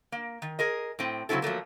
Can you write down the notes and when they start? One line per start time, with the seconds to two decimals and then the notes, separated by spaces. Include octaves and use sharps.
0.12 A#3
0.42 D#3
0.59 G#4 A#4 D#5
0.99 A2 C4
1.29 C#3 F#3 G3 C4 E4 A4
1.42 F3 F#3 A3 A#3